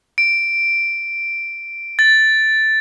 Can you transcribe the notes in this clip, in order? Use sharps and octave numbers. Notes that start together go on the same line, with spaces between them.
D7
A6